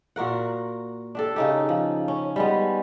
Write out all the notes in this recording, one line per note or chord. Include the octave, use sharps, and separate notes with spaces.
A#2 F#4 A#4 F#5
D4 G4 A4
C#3 D#4 G4
F3
C#4
G3 G#3 B3